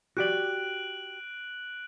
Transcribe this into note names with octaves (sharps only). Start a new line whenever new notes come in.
F#4 G4 D5 F#6 D7 F#7